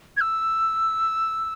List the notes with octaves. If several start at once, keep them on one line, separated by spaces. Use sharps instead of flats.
G#6
E6